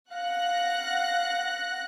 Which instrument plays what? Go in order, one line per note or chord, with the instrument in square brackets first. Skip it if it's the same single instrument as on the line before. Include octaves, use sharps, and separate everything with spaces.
[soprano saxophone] F5 [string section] F#5 F#6 A#6